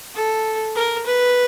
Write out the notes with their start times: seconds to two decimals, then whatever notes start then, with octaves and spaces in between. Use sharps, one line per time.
0.15 A4
0.75 A#4
1.07 B4